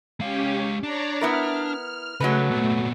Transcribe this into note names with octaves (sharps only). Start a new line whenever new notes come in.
G#3 C#4 G4 F5
D4 C#5 D5 A#5
B3 E4 A#4 F6
C#3 F#3 G#3 A3 B4
A#2 B3